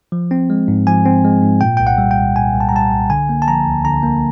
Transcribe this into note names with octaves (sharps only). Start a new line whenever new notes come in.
F3
C4
G#3
G#2
F3 G#5
C4
G#3
G#2
A#2 G5
C2 G5
F#5
G3
G5
C2
A#2 G#5
C2
A5
A#5
G3 A5
C2
D3 G#5
A#3
A5
F3 A#5
D2
D3 A#5
A#3